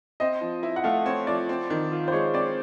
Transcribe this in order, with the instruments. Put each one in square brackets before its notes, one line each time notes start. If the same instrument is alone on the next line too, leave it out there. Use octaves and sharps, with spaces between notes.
[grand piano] C4 [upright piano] D#5
[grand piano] F3
E4
[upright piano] F#5
[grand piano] A3 [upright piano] F5
[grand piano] C4 [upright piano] C#5
[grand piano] F3 [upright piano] D5
[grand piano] C4
D#3
F4
[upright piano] C5
[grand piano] G#3 [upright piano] C#5
[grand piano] C4 [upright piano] D5